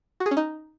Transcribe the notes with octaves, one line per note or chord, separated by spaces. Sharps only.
F#4
G#4
C#4
D#4